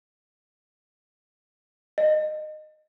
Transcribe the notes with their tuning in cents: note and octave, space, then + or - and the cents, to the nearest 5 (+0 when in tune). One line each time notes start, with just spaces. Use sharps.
D#5 -20